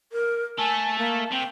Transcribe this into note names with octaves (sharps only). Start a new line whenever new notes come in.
A#4
A3 A4 G#5 A5
A#3
C3 G5